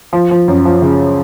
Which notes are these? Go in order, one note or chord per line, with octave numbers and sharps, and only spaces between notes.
F3
F3
F#2
F3
C#3